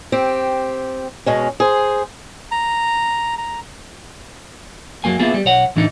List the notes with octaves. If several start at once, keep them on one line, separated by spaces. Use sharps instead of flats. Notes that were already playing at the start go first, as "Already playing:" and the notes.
C4 G4
B2 G#3 C#4
G#4 C5
A#5
A#5
F#2 F3 F#3 A#3 G#5
A#3 B3 E4 F4 G#4
G3
B1 C#5 F#5
A2 E3 D4 D#4